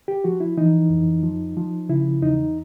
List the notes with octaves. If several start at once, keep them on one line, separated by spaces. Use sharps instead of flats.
G4
F3 F#4
E4
E3 D#4
F2
F3
F3
C#3 E4
E2 D#4